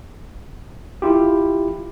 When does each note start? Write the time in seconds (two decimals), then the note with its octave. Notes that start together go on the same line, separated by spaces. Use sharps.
1.02 E4 F4 G4